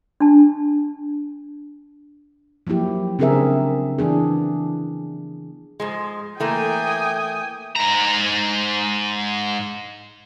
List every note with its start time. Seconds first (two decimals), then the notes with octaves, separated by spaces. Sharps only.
0.20 D4 A5
2.67 F3 F#3 A#3 E4 G4
3.19 C#3 C4 D4 G#4 A#4 E5
3.98 E3 B3 D4 G#4
5.80 G#2 F3 G#3
6.40 E3 A3 A#3 G5 G#5 D#6
7.76 G#2 A#5